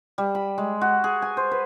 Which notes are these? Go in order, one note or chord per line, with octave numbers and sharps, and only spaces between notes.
G3
B5
G#3
F#4
G#4
G#5
C5
B4